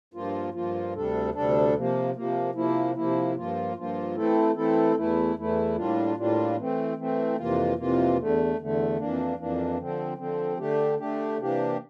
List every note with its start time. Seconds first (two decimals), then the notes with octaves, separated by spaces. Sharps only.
0.14 G2 F3 A#3 F4
0.54 G2 F3 A#3 F4
0.94 D2 C3 G3 D4 A4
1.34 D2 C3 G3 D4 A4
1.75 C3 F3 A#3
2.14 C3 F3 A#3
2.54 C3 F3 A#3 E4
2.95 C3 F3 A#3 E4
3.36 G2 F3 A#3 F4
3.75 G2 F3 A#3 F4
4.15 E3 A3 C4 E4 A4
4.55 E3 A3 C4 E4 A4
4.96 E2 E3 A3 E4
5.36 E2 E3 A3 E4
5.76 A2 G3 A#3 D4 F4
6.16 A2 G3 A#3 D4 F4
6.57 E3 A3 C4
6.97 E3 A3 C4
7.37 F2 C3 E3 A#3 F4
7.76 F2 C3 E3 A#3 F4
8.17 E2 D3 A3
8.57 E2 D3 A3
8.98 F2 E3 A#3 D4
9.37 F2 E3 A#3 D4
9.78 D3 F3 C4
10.18 D3 F3 C4
10.57 D3 A3 D4 G4
10.98 D3 A3 D4 G4
11.38 C3 E3 A#3 D4 G4